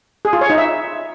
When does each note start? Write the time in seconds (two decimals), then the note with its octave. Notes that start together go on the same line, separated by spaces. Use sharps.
0.25 G#4
0.33 F4
0.41 C#5
0.50 D#4
0.58 E5